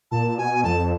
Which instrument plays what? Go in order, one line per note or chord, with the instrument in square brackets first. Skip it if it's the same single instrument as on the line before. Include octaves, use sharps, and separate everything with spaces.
[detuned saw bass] A#2 [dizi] A5
[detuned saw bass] B2 [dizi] G#5
[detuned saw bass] F2 [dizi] A5